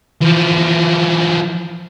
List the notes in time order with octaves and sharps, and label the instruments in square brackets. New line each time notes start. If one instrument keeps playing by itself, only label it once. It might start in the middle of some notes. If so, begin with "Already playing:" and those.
[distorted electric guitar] E3 F3